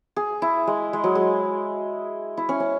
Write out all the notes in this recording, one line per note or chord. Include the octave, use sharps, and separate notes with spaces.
G#4
E4
G#3
G#3
F#3
G#3
E4
C#4
C#4